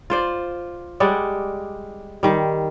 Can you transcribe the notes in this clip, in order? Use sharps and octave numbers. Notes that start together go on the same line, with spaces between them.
F4 C5 D5
G3 G#3 D5 F#5
D#3 G3